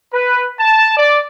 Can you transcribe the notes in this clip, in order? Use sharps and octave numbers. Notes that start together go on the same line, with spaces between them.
B4
A5
D5